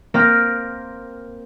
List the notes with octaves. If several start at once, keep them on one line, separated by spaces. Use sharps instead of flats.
A#3 C4 F6 A#6